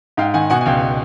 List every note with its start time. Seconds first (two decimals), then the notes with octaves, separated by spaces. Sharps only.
0.17 G#2 F5 G5
0.34 D#3 F#5 G#5
0.50 B2 F#5 G#5
0.61 G#5
0.66 C#2 F5 G5